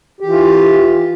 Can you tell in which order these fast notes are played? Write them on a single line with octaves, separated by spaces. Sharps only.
G4 E3 F4